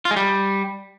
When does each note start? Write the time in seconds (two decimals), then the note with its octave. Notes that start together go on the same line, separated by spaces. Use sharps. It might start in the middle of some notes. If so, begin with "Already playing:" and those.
0.05 F4
0.11 G#3
0.16 G3